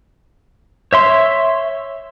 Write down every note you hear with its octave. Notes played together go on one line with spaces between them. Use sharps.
C#5 E5 C6